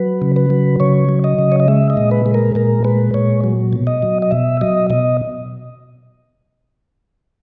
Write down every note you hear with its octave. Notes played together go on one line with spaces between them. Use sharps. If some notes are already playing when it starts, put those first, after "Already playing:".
Already playing: F#3 B4
C#3
B4
F#3
C#3 C#5
F#3
D#5
C#3
C#5
D#5
G#3 E5
D#5
A#2
B4
G#3
A#4
A#2 A#4
G#3 B4
A#2 C#5
F#3
B2
D#5
F#3
D#5
B2 E5
F#3 D#5
B2 D#5